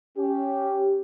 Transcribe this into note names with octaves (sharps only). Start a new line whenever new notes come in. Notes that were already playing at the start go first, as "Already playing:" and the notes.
C#4 G4